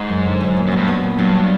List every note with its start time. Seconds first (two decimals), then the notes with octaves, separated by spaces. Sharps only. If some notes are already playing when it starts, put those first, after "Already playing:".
Already playing: G#2
0.09 F#2
0.26 D3
0.41 F#3
0.57 A#2
0.67 F#2
0.72 F#3
0.77 G2
0.88 B3
1.04 A#2
1.18 G2 F#3
1.35 B3